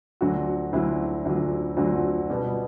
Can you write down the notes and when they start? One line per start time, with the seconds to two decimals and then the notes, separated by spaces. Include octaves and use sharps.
0.21 D2 D3 F#3 F#4
0.73 D2 D3 F#3 E4
1.25 D2 D3 F#3
1.77 D2 D3 F#3 F#4
2.30 B2 G3 B3